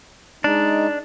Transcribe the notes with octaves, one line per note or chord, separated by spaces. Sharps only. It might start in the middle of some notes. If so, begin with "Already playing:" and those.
G#3 D4 D#4